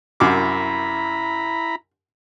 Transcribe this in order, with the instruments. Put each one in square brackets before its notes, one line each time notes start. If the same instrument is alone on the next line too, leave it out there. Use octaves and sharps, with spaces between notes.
[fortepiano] C2 F#2 D6 [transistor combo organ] E4 A#5 B5